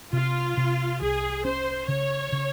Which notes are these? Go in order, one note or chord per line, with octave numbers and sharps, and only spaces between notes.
C3 F4
C3
C2 G#4
C#4 C5
C#3 C#5
C#3